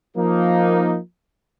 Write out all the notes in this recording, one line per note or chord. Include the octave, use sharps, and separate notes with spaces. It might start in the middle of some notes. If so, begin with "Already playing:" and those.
F3 A#3 D#4